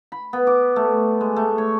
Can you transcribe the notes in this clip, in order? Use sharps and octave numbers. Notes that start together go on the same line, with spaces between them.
B5
B3
D6
A3
G#3
A3
C#5